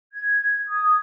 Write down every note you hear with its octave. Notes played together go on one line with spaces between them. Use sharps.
G#6
D#6